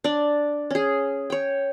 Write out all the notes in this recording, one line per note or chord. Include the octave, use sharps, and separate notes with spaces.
D4 D5
C#4 G#4
C#5 G5